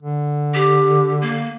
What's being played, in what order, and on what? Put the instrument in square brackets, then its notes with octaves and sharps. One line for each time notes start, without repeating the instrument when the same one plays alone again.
[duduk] D3
[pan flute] G4
A#3